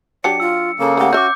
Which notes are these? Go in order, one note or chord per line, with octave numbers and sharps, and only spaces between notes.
F#3 D4 G4 D5 C#7
F4 E6
C#3 A#3 A4
A3 G4 F#5
C#4 F#4 E5 D6 G6